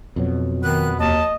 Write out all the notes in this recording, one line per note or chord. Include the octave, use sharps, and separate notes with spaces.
F2 B2 F#3
D#3 B3 F#6
D#2 D#5 A5